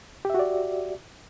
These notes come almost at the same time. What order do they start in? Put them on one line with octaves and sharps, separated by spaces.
G4 E5 F#4 D5